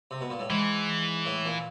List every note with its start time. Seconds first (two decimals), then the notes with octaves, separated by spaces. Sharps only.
0.11 C3
0.21 B2
0.30 A#2
0.39 A2
0.50 G#2 E3
1.26 A2
1.46 A#2